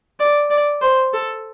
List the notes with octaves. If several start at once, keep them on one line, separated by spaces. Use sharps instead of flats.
D5
D5
C5
A4